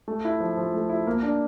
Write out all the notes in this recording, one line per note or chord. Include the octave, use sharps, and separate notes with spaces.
A3
E4
F3
F3
A3
E4
A#3
D4